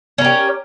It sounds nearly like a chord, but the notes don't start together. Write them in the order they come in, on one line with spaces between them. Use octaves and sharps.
C#4 A#4 G4